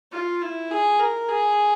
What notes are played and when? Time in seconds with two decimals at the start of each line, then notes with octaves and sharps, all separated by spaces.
0.12 F4
0.42 E4
0.71 G#4
0.99 A#4
1.28 G#4